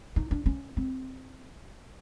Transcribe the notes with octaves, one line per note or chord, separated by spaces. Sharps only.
D#4
D4
C#4
C4